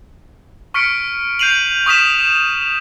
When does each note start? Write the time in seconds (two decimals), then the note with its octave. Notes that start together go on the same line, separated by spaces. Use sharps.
0.74 C#6 F6 B6 C#7 D7
1.39 G6 C7 D#7 F7 F#7
1.86 C#6 D#6 F6 B6 E7